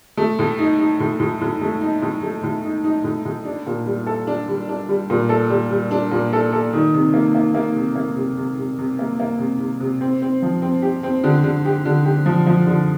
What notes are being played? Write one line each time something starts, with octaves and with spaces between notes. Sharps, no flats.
A3
A2
D#4
D#4
A2
A2
A2
A3
D#4
A2
A3
A2
D#4
D#4
A2
A2
D4
A#2
G3
A4
D4
G3
D4
G3
A#2
A4
G3
G3
D4
A#2
A4
A4
D#3
C3
A#3
A#3
A#3
C3
A#3
C3
C3
C3
C3
A#3
A#3
C3
C3
C3
C4
C4
F3
C4
G4
C4
D3
D3
G4
D3
G4
F3
F3
D3